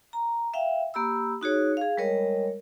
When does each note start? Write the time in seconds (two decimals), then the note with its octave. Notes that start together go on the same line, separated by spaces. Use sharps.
0.13 A#5
0.54 E5 F5 G5
0.94 A#3 G4 B5 E6
1.41 D#4 F#4 G#4 C#5
1.77 G#4 F5
1.97 G3 G#3 A#4 C#5 D#5